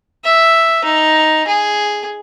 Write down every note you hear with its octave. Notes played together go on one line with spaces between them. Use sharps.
E5
D#4
G#4